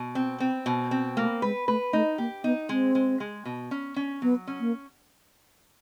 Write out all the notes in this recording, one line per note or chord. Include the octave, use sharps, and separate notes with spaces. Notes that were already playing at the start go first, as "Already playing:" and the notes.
Already playing: B2
C4
C4
B2
C4
A3 A#3
G#3 B4
A3 B4
A3 D#4
A#3 G4
B3 D#4
G#3 C4
G#3
G#3
B2
C#4
C#4
F#3 B3
C#4
A#3